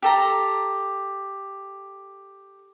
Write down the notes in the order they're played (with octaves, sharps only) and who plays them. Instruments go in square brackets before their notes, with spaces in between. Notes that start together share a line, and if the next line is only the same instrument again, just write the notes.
[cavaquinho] G4 A4 A#5